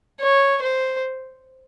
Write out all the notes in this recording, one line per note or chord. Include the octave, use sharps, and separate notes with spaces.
C#5
C5